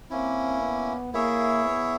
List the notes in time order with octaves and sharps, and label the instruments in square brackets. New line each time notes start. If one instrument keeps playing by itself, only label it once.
[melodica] A#3 C#4 E4 [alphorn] C4
[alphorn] B3
[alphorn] A#3 [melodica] E4 G#4 C#5 E5
[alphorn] B3